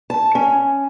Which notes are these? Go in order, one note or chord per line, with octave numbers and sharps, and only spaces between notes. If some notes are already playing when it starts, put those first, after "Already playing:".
A5
C#4